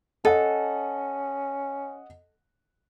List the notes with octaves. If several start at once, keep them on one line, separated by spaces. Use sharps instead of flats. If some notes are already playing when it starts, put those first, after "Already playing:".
C#4 A4 D#5 F#5